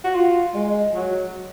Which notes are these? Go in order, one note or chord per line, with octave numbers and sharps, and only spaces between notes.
F#4
F4
G#3
F#3